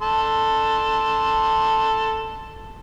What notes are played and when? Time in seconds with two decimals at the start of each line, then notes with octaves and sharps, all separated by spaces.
0.02 A4 C6